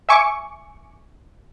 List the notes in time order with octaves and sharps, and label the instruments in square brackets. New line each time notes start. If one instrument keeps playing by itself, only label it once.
[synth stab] E5 G#5 C#6 D6